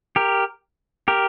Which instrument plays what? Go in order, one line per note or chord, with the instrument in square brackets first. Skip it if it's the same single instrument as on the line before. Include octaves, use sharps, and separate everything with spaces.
[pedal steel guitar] G4 A#4
G4 A#4